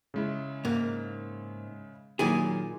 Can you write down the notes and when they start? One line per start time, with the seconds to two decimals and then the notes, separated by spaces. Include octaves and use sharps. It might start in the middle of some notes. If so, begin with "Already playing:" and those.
0.14 C#3 G#3 E4
0.65 G#2 A#3
2.19 A#2 D#3 F#3 E4 G#4